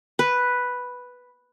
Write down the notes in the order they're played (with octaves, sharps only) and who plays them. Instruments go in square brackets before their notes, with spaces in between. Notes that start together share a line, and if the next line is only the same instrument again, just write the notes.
[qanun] B4